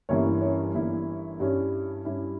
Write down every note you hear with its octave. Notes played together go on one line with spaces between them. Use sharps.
G1 G2 E3 A#3 C#4 E4 C#5
C#4 C#5
G1 G2 E3 A#3 E4
G2 G3 C#4 E4
G2 G3 C#4 E4